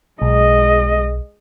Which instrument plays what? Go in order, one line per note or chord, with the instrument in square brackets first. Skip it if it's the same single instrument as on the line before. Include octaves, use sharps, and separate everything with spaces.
[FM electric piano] B1 [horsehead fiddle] G#3 D#5